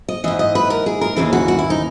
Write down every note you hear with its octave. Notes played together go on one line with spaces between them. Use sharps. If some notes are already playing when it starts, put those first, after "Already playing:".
D#5
G#2 E3 D#5
D#5
B4
A#4
G#4
A#4
D#2 C#3 E3 G#4
F#4
F#4
E4
D#4